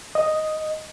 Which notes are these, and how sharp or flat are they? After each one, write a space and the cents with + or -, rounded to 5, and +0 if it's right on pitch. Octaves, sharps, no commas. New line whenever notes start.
D#5 +0